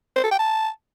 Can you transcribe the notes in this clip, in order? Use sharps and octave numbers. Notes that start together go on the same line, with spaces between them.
C5
A4
G5
A5